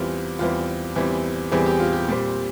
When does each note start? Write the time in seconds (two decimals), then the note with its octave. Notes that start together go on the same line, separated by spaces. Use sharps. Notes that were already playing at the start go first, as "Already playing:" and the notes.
Already playing: E2 E3 G3 C4 F4
0.39 E2 E3 G3 C4 F4
0.96 E2 E3 G3 C4
1.51 E2 E3 G3 C4 G#4
1.66 G4
1.80 F4
1.93 G4
2.08 A#2 G3 C4